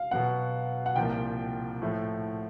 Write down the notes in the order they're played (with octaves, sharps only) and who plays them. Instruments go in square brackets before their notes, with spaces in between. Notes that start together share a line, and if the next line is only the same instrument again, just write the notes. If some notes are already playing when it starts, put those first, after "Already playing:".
Already playing: [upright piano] F5
[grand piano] B2 F#3 B3 [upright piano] F#5
[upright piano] F#5
[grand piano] C2 A#2 F3 A#3 [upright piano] G5
[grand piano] A2 F3 A3